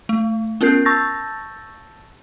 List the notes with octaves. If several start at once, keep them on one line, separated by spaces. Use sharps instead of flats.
A3
B3 C#4 F4 A#4 G6 C7
A5 C#6 E6 G6 A6 A#6